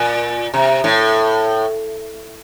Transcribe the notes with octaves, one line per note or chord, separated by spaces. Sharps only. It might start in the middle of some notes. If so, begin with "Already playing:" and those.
Already playing: A#2
C3
A2